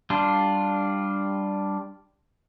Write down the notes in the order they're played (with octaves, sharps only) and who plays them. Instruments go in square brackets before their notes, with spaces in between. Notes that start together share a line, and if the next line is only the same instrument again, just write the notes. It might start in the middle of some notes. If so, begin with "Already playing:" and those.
[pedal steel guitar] G3 D4 F4